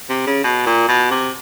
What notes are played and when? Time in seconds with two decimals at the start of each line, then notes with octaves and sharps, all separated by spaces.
0.09 C3
0.27 C#3
0.44 B2
0.66 A#2
0.88 B2
1.11 C3